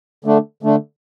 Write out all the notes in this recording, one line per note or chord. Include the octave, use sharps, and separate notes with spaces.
D3 A3 D4
D3 A3 D4